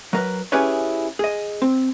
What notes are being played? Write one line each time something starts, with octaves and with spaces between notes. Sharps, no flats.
F#3 A#4 B4
C#4 E4 G4 G#4 B4 C#5
G#4 D#5
C4